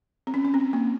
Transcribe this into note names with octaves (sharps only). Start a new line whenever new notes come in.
C4
C#4
C#4
C4
A#3